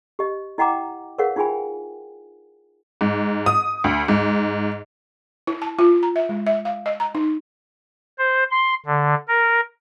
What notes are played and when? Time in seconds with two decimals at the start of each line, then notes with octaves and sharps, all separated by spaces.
0.19 G4 D#5
0.58 E4 D#5 F#5 G5 A#5 D6
1.18 G#4 A#4 B4 C#5 F5 F#5
1.36 D#4 F4 G#4 G5 G#5 B5
3.01 G#2
3.46 D#6
3.84 D2
4.08 G#2
5.47 E4
5.62 A5
5.79 F4
6.03 A#5
6.16 E5
6.29 G#3
6.47 E5
6.65 F5
6.86 D#5
7.00 A#5
7.15 D#4
8.18 C5
8.51 C6
8.86 D3
9.28 A#4